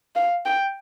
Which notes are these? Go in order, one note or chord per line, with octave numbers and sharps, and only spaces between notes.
F5
G5